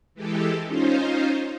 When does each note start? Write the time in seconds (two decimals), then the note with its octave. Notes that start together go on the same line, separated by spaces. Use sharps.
0.14 E3 G#3 G4 A4
0.66 C#4 D#4 F4 C5